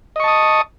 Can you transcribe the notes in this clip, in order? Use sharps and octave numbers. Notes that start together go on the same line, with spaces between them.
D#5 A5 C#6 D#6